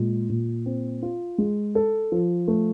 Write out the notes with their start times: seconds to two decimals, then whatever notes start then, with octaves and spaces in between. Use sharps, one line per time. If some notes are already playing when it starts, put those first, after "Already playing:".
Already playing: A#2 G#3
0.29 A#2
0.66 C4
1.03 F4
1.38 G#3
1.75 A4
2.12 F3
2.48 A3